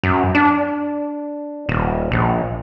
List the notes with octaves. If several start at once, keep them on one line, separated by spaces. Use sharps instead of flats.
F#2
D4
D#1
A#1